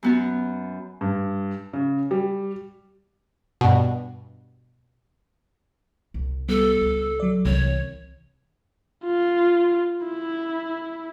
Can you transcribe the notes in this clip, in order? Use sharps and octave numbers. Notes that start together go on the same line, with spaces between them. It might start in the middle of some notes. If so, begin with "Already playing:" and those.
F#2 B3 F#4
G2
C#3
G3
G2 B2
C2
G3 B3 A4
C#2
F#3 D5
C2 C3 E3 C#5
F4
E4